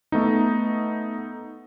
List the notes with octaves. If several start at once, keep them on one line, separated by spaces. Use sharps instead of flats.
A3 B3 D#4